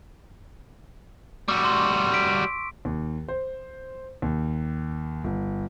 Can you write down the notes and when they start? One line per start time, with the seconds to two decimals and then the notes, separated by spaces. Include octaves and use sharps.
1.48 G3 F#4 C#6 D6 E6
1.64 C6
2.14 B6 D7
2.85 D#2
3.28 C5
4.22 D#2
5.24 G1